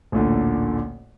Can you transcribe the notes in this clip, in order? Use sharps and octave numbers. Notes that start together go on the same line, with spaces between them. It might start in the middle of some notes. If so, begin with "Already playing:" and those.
A1 D2 A#2 D3